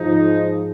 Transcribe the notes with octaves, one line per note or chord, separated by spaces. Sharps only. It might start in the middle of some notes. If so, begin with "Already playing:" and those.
Already playing: G#2 F3 G#3 D#4